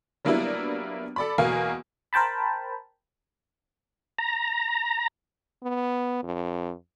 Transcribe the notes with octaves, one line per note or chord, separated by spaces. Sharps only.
F#3 G3 A#3 B3 D4 E4
A4 D5 B5
E2 B2 A#3 F#4 F5 G#5
A#4 C5 G5 A5 B5
A#5
B3
F2